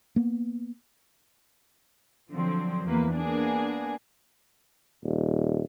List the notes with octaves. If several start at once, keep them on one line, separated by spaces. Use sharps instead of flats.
A#3 B3
D3 F3 F#3 C4
E2 A#3 B4
A#3 B3 D4 G#4
D#1